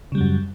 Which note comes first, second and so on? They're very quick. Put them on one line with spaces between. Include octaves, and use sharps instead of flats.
C#3 G3 F#3 F#2